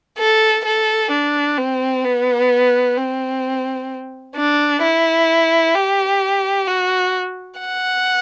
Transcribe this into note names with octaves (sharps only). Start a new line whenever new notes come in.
A4
A4
D4
C4
B3
C4
D4
E4
G4
F#4
F#5